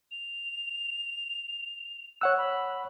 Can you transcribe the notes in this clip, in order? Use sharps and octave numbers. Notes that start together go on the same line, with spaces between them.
F7
C#5 F#5 E6 F#6
B5